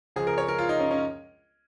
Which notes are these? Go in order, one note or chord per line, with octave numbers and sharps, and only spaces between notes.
C#2 C#3 F3 G#3 G#4
A#4
C#5
A#4
F4
D#4
C#4
C#4